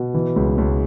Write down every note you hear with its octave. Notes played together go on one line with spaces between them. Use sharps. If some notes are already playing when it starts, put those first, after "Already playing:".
Already playing: B2
E3
C#2
C#2